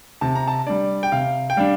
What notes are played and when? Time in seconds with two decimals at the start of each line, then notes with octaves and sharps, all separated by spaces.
0.21 C3 A5
0.35 A#5
0.48 A5
0.66 G3 D4 D5
1.03 G5
1.12 C3 F5
1.50 G5
1.57 G3 D4 F5